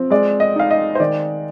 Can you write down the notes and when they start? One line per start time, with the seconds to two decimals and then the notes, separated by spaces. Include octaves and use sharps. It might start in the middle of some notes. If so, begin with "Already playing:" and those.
Already playing: F3 C4
0.10 G#3 D5
0.40 D#5
0.56 D#4 F5
0.70 D#5
0.95 C5
1.00 D#3 D5